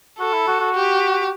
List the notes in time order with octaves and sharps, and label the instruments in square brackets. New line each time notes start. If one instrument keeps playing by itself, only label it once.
[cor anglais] F#4 [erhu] A4
[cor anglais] E4
F#4
F#4
[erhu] G4